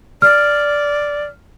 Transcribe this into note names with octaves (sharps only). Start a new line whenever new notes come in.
D5 F6